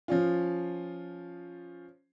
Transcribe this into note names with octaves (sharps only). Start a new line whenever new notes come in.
F3 C#4 F4